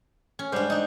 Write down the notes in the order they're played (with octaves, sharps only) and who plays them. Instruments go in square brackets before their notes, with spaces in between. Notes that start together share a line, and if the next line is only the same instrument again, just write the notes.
[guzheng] C#4
[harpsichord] G#2 G3 [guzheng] D4 C5
[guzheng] D4 D#4